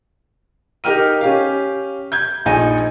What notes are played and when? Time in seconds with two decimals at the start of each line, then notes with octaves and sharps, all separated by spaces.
0.84 D#4 G4 A#4 G5 F6 D#7
1.21 C#4 G4 F5
2.12 G6 G#6
2.46 A#1 D#4 G#5 D#7